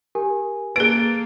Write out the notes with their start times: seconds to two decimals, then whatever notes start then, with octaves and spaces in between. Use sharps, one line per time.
0.15 G4 A#4 G#5
0.76 A#3 G#4 A4 B4 D7